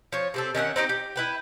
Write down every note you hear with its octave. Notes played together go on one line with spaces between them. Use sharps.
F3 C#5
C3 C4 A4
D#3 C#4 E5 F#5
C4 D#4 G4 D#5
G4
E4 B4 G5